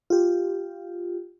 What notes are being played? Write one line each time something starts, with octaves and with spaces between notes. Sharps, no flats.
F4 G4